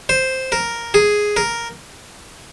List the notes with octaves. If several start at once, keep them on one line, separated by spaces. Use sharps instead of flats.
C5
A#4
G#4
A#4